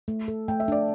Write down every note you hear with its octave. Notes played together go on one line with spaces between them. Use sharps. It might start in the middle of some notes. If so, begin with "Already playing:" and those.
A3
A4
A3 G5
E5
D4 D5